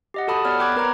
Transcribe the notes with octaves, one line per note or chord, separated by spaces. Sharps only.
G4 D#5 F#5
F#4 A4 A5 B5 D#6
B3 C#5 D5 F#5 B5 F6
G5 B5 D6 F#6 G#6
B3 A#4 B4 A#5 G#6